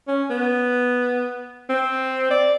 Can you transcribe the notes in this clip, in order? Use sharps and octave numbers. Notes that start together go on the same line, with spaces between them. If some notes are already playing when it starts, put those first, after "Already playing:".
C#4
B3
C4
D5